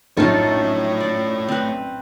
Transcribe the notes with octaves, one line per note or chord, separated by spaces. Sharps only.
A#1 F#2 A2 A3 D#4 F4 A4 C#5
D5
C4 B4